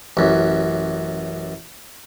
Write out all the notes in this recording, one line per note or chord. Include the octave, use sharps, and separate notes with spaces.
A1 F#2